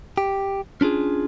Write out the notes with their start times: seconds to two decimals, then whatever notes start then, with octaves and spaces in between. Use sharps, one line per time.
0.18 G4
0.81 C#4 D4 F4 G#4